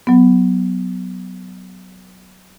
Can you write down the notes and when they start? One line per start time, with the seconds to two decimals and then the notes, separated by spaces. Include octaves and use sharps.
0.07 F#3 B3